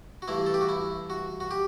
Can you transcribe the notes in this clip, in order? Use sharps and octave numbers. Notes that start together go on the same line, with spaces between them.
F#4
G2 E3 A3 E4
A4
G4
F#4
E4
F#4
F#4
G4